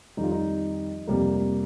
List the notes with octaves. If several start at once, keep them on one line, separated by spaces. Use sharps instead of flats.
F2 D#3 G3 D#4
F4
D#4
F2 C3 G3 A#3